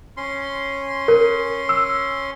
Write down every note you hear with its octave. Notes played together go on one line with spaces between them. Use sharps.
C#4 C6
A#4
E6